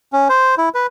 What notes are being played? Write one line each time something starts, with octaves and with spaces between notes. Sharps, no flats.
C#4
C5
E4
B4